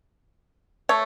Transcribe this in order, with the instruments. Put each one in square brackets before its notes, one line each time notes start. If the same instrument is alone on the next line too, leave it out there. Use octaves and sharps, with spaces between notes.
[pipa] A3 C#5